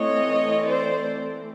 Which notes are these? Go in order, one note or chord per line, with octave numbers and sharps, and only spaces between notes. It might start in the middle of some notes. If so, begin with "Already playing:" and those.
Already playing: E3 A3 C4 C#5 D#5
C5 D5